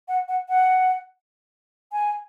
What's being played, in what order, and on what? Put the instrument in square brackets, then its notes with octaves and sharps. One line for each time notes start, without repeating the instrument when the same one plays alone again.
[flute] F#5
F#5
F#5
G#5